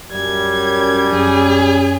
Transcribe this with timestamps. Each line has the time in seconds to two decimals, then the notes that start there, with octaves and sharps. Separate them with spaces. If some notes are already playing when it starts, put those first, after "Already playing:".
0.12 F#2 G3 G#6
1.13 F#2 F#3 C#4 G#4